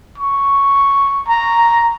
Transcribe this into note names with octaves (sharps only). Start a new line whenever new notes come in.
C#6
A#5